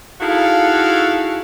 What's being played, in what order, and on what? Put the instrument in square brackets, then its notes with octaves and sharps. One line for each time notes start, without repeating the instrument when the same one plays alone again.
[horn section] D#4 E4 F#4 G#4 A4 F5